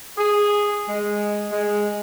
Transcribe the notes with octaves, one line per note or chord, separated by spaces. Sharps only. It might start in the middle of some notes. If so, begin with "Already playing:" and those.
G#4
G#3
G#3